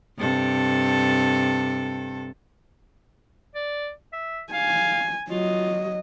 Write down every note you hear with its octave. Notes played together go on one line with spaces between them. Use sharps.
G2 C3 A4
D5
E5
F5 G#5
F#3 F4 D#5